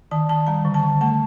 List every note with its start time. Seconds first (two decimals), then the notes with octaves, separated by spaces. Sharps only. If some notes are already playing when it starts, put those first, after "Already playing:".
0.11 D#3 A5
0.29 D#3 A5
0.47 G3 A#5
0.65 D3
0.74 A5
0.83 D3
1.01 A3 A5